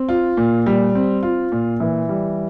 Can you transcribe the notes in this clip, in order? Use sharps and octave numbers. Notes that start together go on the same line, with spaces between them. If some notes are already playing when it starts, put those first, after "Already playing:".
Already playing: C4
F4
A#2
G3
C4
F4
A#2
E3
G3